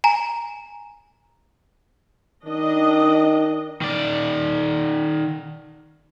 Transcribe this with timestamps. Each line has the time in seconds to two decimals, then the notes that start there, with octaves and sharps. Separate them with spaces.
0.04 G#5 A#5
2.46 D#3 D4 D#5
3.81 D#3 D5